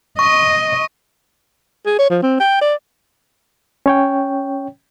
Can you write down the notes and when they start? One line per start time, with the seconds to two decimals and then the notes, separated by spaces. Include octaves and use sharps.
0.19 D#5 C#6
1.86 G#4
1.98 C#5
2.10 F3
2.22 C4
2.40 G5
2.61 D5
3.86 C#4 C#5 G5